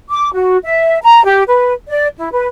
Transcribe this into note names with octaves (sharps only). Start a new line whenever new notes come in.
D6
F#4
E5
A#5
G4
B4
D5
E4
B4